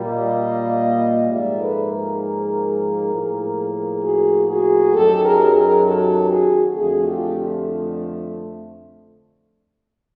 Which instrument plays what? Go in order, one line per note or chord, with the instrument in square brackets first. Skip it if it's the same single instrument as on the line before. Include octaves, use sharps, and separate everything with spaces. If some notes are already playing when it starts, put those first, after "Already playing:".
Already playing: [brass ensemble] A#2 G3 A#3
D#5 F5
G#2 F3 A#3 D5 E5
A4 B4
G#4 A#4
A2 F3 A#3
F#4 G#4
F#4 G#4
F#2 D#3 F#3 G4 A4
G#4 A#4
G#4 A#4
G4 A4
F#4 G#4
F2 D3 F3 A3 F#4 G#4
F4 G4